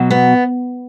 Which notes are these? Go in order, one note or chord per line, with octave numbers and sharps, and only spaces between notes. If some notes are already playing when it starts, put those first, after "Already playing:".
Already playing: B2 F#3
B3